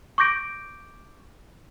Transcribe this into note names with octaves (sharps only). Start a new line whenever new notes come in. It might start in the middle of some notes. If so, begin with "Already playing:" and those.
C#6 D6 G6 A#6 D7